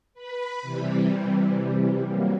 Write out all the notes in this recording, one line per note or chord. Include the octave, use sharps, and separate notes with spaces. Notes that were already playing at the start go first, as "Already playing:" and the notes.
B4 B5
C3 E3 G3
F#3 G3 A#3